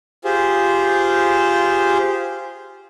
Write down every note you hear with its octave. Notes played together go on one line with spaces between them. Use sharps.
F4 G4 G#4 C5